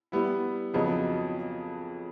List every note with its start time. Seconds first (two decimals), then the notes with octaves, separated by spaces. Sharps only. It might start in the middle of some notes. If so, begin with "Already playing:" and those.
0.12 G3 B3 E4
0.74 F2 C#3 F#3 B3 D#4